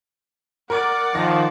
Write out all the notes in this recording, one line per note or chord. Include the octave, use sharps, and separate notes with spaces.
A#4 D5 F#5
D#3 F3 A#6